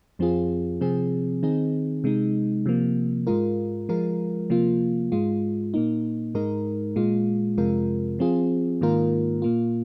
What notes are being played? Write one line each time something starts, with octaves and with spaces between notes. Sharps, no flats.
F2 F3 C4 F4 G#4
C3 F3 C4 G#4
D#3 C4 D#4 G#4
C3 G#3 D#4
C3 F3 A#3
G#2 G#3 F4 A#4
F3 G#3 F4 A#4
C3 F3 A#3 F4
G#2 G#3 F4
A#2 A#3 D#4
G#2 G#3 D#4 A#4
A#2 G#3 F4
F2 C3 G#3 F4 A#4
F3 C4 F4 G#4
G#2 D#3 A#3 F4 A#4
A#2 A#3 F4